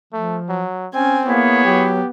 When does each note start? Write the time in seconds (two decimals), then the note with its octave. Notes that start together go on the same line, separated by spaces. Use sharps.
0.13 F3 A3
0.49 F#3
0.94 C4 C#4 G#5
1.27 A#3 B3 E4 G#4 C#5
1.65 F#3 G4